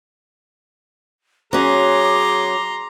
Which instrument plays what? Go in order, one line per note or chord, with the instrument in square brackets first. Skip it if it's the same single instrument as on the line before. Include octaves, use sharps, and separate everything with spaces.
[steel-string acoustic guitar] F#3 C#4 [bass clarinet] G#4 [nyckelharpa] A#5 C6 [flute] D6